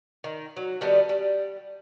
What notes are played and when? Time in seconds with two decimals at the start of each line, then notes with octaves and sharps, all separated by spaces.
0.24 D#3
0.56 F#3
0.81 D#3 G3 A3 B3
1.09 G3